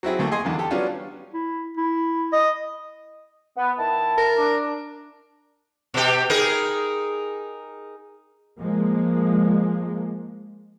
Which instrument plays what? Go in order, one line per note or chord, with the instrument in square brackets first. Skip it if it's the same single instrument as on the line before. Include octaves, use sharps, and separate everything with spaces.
[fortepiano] F#3 C4 E4 G#4
D2 A3 A#3
G#4 D#5 G#5 C6
E2 D3 D#3
G4 A4
F#3 G3 B3 C#4 D4 F4
[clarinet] E4
E4
D#5
[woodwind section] B3
D#3 E4 A5
[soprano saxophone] A#4
[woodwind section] D4
[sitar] B2 G4
D#4 G#4 A#4
[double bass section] F3 G#3 A#3